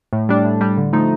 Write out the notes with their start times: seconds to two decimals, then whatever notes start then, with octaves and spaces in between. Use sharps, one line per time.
0.13 A2
0.29 G3 D4
0.45 A2
0.61 G3 D4
0.77 D3
0.93 F3 A3 D#4